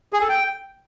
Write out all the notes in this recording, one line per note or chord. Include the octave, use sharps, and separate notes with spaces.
G#4
A4
G5